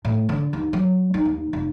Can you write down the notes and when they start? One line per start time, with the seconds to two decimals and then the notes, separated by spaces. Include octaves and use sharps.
0.05 A2
0.29 D3
0.53 D#2
0.73 F#3
1.14 D#4
1.25 D#2
1.53 F1